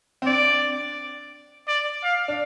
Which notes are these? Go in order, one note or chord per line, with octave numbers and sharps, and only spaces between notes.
C4
D4 D5
D5
F5
D4